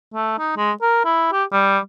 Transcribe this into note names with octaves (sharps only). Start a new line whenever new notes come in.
A3
D#4
G#3
A#4
E4
G4
G3